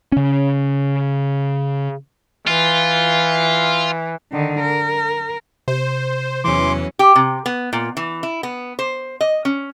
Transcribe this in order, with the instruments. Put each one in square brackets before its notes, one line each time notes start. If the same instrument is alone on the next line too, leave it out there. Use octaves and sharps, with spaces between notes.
[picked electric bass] C#3 C#4
[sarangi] E3 [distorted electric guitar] F4
[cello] D3 D#3
A#4
[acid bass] C3 [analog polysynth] C5
[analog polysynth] E2 E3 [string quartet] F#3 C#4 [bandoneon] C6 D6
[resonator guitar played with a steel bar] G4
C3
B3
A#2
E3
E4
B3
C5
D#5
C#4